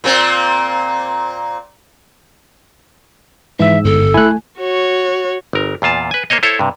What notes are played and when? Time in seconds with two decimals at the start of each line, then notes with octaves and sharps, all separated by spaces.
0.04 A#2 A#3 C4
3.59 G#2 E3 E5 E6
3.84 G1 A4
4.14 A3 E4 G#5 F#6
4.60 F#4 C#5
5.53 G1 A#4
5.82 E2 A#2 F4 A5
6.11 B4 G#5
6.30 A#3 C5 C#5 D#5
6.43 E4 A4 C5 C#5
6.59 G2 C3